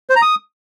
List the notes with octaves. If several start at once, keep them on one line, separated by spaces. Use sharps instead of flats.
C5
A#5
D#6